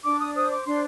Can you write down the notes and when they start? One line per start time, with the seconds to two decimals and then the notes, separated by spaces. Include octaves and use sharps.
0.04 D4 D6
0.20 D#6
0.35 C5 D#6
0.51 D6
0.66 D4 C6